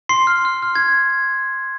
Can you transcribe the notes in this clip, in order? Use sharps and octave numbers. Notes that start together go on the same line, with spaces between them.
C6 C7
F6
F6
F6
G#6